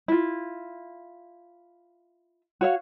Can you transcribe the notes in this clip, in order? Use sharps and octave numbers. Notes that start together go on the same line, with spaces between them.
E4 F4
F#4 C#5 F5